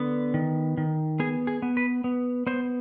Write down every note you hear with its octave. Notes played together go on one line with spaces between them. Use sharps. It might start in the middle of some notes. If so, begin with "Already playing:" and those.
Already playing: D3 B3
D#3
D#3
B3 G#4
G#4
B3
B4
B3
B3 C5